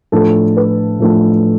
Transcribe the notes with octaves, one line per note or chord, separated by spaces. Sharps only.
A2 F3 A3 D4 A4
B4
A2 F3 A3 D4